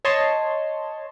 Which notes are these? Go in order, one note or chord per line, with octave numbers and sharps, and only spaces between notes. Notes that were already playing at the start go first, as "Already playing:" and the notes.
C#5 D#5 A5 C6